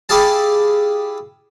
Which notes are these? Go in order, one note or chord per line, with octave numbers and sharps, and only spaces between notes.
E4 G4 G#4 F5 A5